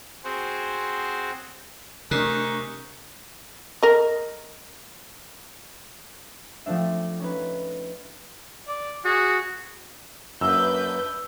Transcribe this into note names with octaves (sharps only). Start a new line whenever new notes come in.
C4 F#4 G#4 C5
C3 A3 D4 D#4 A#4 G#5 C#6 F#6
A#4 D#5
F3 A3 C4 D4 E5
C#4 D#4 B4
D5
F#4 G#4
F#2 A#3 D4 B4 E5 E6 G6